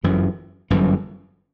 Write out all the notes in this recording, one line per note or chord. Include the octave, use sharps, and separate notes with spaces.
G1 F#2 E3
G1 F#2 E3